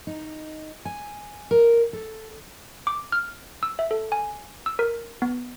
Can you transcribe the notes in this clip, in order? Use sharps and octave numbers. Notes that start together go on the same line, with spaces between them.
D#4
G#5
A#4
A4
D6
F6
E6
E5
A4
G#5
E6
A#4
B3